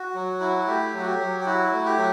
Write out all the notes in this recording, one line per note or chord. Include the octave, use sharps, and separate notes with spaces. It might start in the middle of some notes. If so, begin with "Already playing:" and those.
Already playing: F#4
F#3
E4
A3 G4
F#3 F#4
G4
F#3
G4
E4 F#4
A3
G4
F#3